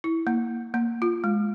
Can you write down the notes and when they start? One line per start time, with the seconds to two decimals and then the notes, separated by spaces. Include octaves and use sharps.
0.04 E4
0.27 A#3
0.74 A#3
1.02 F4
1.24 G#3